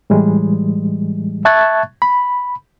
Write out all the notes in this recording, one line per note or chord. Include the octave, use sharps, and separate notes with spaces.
A2 E3 G3 G#3
E5 A5 C#6 F#6 G#6 A6
B5